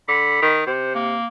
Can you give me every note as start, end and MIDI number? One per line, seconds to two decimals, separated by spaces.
0.08 0.42 50
0.08 0.53 83
0.42 0.64 51
0.67 1.17 48
0.67 0.91 72
0.95 1.27 58